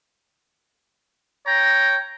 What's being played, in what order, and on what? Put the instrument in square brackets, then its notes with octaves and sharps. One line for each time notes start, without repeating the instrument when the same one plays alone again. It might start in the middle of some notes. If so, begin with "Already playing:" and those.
[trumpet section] C#5 G5 A#5